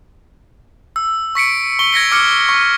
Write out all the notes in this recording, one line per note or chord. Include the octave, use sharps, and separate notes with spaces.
E6
C#6 B6 C#7 D7
C#6 G7
G#6 A#6 B6 C#7
D6 F6 C#7
C#6